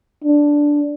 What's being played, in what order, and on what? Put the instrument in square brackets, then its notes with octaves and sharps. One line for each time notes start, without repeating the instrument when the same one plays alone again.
[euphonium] D4